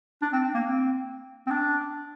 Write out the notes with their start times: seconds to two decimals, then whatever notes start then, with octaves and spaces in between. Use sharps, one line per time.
0.22 D4
0.33 C4
0.54 A#3
0.65 C4
1.47 C4
1.50 D4